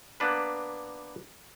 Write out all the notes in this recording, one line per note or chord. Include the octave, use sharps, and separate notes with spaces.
A#3 B3 D4 B4